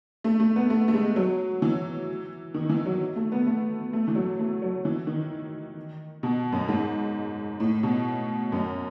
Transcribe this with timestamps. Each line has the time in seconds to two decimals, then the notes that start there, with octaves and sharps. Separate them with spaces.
0.24 A3
0.40 A3
0.56 B3
0.70 A3
0.88 A3
0.94 G#3
1.16 F#3
1.62 E3
2.54 D#3
2.69 E3
2.86 F#3
3.16 A3
3.32 B3
3.47 A3
3.93 A3
4.08 E3
4.15 F#3
4.39 A3
4.62 F#3
4.85 E3
5.07 D#3
6.23 B2
6.53 F#2
6.68 G#2
7.60 A2
7.83 B2
8.52 F#2